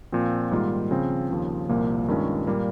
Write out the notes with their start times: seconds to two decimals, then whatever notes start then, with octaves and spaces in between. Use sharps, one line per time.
0.12 A#2 F3 C4
0.51 G#2 D#3 G3 A#3 F4
0.91 C#3 F3 C4
1.30 D#2 C#3 F3
1.69 C2 A#2 F3 A#3
2.08 G2 D#3 G#3 C#4 F4
2.47 A#2 G3 A#3